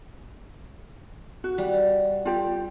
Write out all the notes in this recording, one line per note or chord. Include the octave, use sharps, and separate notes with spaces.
F#4
G3
F4 G4